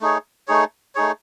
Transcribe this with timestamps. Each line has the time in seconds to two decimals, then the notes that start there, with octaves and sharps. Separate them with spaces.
0.01 A3 D#4 G#4 C#5
0.48 A3 D#4 G#4 C#5
0.95 A3 D#4 G#4 C#5